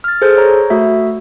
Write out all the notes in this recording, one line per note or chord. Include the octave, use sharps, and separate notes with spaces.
F6 A6
G#4 A4 C5 G6
C#5 A#5
A3 F#4 E5